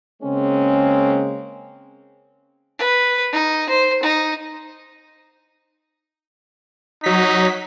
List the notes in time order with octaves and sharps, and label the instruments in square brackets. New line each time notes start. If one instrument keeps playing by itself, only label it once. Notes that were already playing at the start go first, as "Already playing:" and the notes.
[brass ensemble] C#3 G#3 A#3 C4 C#4
[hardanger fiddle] B4
D#4
C5
D#4
[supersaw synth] F#3 B6 [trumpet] D#4